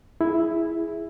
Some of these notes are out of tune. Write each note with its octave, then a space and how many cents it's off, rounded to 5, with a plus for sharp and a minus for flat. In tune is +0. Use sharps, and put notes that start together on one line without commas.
E4 +0 G#4 +0